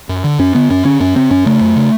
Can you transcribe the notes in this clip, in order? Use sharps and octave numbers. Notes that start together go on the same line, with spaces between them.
F#2
D3
F#2 C#4
D3 B3
F#2 C#4
D3 C#4
F#2 C#4
C#3 C4
F#2 C#4
C#3 A3
F#2
C#3